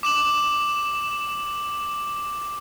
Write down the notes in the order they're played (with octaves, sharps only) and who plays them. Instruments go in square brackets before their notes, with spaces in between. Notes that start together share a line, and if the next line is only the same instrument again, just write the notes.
[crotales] D6 E7 F#7